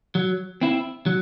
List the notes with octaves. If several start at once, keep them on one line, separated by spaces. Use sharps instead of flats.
F#3
C4 E4
F#3